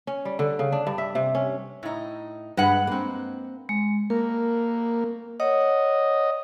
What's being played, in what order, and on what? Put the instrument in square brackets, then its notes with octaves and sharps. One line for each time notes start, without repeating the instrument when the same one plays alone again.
[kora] C#4
G3
D3
C#3
D4
G2
E5
C3
C#4
[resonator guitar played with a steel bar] A2 D#4
[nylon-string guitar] G2 [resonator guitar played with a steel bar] G#3 B4 F#5
[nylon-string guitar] A#3 C4
[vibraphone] G#3
[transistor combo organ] A#3 [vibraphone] A#4
[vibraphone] C#5 F#5 [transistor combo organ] D#5